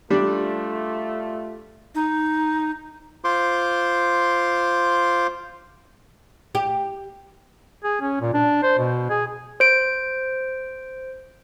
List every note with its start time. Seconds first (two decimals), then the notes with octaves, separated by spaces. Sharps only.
0.10 G3 A3 D4 F4
1.95 D#4
3.24 F4 C5 C6 D6
6.55 G4
7.84 G#4
8.01 C#4
8.21 A#2
8.34 D4
8.63 C5
8.78 B2
9.10 G#4
9.60 C5 D7